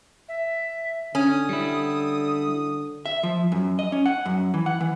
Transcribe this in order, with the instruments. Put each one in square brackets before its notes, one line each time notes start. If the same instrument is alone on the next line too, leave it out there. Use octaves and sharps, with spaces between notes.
[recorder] E5
[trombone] D3 [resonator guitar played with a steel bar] C#4 [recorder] D#6
[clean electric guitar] G3 E4
[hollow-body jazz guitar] E5
F3
F#2
D#5
C#4
F#5
F#2
E3
F#5
E3